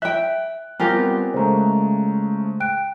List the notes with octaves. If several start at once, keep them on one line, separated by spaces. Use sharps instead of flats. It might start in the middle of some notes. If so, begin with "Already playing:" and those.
E5 G5 F#6
G3 B3 C4 F4 G4 A#4 G#5 D6
C#3 G#3 A3 C5 A#5
G5 F#6 D7